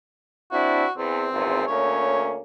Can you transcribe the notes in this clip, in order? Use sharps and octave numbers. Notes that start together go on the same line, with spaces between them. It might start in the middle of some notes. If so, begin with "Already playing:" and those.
C4 D4 E4 F#4
E2 C4
G#1 E2 A#2
D2 A#3 C#4 C#5